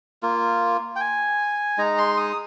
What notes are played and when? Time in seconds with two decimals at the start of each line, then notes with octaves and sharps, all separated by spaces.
0.23 A#3 F4
0.96 G5
1.00 G#5
1.78 G#3 D#4 A#5
1.98 C6
2.17 D#6